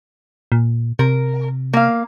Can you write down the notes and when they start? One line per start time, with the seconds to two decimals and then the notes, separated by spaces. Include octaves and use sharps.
0.52 A#2
0.99 C3 A#4
1.73 A#3 F5